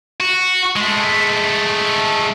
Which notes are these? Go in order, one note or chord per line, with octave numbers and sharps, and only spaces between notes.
F#4
G#3 A3